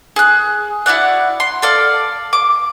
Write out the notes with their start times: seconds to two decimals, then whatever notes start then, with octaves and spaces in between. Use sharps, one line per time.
0.16 G#4 F#6
0.86 E4 F#4 D5 F#5
1.40 C6
1.62 A4 D5 F5
2.33 D6